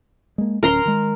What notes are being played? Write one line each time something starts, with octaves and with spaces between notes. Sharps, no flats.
G#3 A#3
D1 C#4 A#4 A#5 C6
D#3 G#3